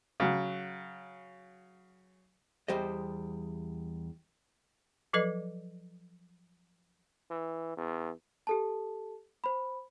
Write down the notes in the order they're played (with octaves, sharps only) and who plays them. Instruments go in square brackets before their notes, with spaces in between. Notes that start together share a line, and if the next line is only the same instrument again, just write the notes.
[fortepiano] C#3 F#3
[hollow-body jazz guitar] E2 G3 G4 C5 D#5
[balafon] F3 F#3 A4 B4 D#5
[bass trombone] E3
E2
[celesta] G4 A4 A5
C5 B5